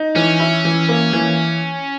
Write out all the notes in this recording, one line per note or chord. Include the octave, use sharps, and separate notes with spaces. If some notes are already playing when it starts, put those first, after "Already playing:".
Already playing: D#4
E3 C#4
E4
E3
A#3
E3